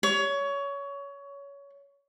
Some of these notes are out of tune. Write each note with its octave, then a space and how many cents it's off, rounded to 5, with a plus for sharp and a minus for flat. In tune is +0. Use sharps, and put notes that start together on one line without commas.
C#5 +20